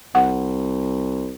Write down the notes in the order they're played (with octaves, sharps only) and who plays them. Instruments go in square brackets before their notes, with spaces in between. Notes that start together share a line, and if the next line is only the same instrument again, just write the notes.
[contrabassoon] C2 [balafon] F#5